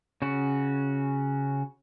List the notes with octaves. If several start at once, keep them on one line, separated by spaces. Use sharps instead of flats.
C#3 C#4 F#4